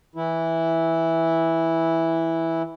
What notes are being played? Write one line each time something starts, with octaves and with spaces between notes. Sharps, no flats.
E3 E4